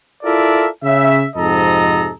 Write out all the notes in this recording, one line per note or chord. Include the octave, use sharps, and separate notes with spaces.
E4 F4 A4 A#4 D5 E5
C#3 E5
F2 G#2 C3 A4 D#5 A#5